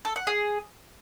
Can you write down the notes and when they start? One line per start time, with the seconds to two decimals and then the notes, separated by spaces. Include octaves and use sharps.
0.05 A4
0.16 F#5
0.27 G#4